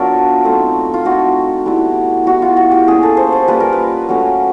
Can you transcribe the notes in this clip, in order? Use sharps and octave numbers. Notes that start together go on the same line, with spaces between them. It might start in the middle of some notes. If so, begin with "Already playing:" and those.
Already playing: F#3 B3 D4 F4 A#4 D5
A3 C4 D#4
F4
A3 C4 D#4 F#4
G3 B3 E4
G3 B3 E4 F#4
F4
F#4
G4
G3 A#3 C#4 F4 G#4
A4
C5
C5
G3 A#3 C#4 F4 B4
A#4
B4
F#3 A3 C#4